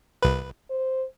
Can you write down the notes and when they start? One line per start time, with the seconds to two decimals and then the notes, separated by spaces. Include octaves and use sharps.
0.23 C2 B4
0.70 C5